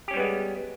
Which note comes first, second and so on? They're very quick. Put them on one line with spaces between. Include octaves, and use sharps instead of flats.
G4 C#4 G3 B3 G#3